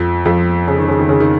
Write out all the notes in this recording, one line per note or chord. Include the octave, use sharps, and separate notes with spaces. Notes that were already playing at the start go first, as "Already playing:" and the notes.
Already playing: F2 F3
F2 F3
C#3
D#3
C#3
D#3
C#3
D#3